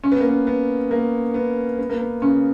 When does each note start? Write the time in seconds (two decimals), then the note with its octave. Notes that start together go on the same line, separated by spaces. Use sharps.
0.04 C#4
0.12 B3
0.21 A#3
0.29 B3
0.47 B3
0.91 A#3
1.34 B3
1.79 B3
1.89 A#3
2.01 B3
2.22 C#3 C#4